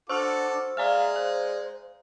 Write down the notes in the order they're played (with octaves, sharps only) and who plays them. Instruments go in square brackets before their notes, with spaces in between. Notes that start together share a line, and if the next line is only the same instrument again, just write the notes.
[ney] D4 [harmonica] F#4 A4 D6 [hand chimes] C5 [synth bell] C#6 E6 F6
[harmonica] G#3 [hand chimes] D5 F6 [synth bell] E5 G#5 A#5 [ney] F5
[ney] C5 [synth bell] F5